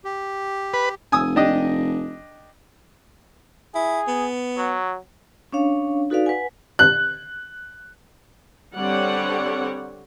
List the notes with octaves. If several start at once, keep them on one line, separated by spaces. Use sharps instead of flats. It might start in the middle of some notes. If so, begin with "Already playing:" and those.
G4
B4
F1 G#5 D#6 E6
D4 G4 D#5
E4 G#4
B3
F#3
C#4 D4 C#5 F5
D#4 F#4 A4 B4 D5 F5
B4 F#5 G#5
F#6
D3 G3 C4 C#5 D5 F#5